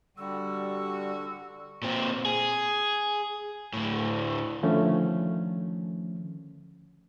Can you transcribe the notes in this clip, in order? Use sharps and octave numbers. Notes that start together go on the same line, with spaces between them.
D3 G3 F#4 E6
A#2 C4
G#4
D2 A2
D3 D#3 F3 A3 C#4